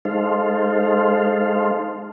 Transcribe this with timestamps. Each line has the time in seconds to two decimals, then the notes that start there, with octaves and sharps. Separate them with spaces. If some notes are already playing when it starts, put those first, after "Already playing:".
0.05 G#3 D#4 A4 C5 F5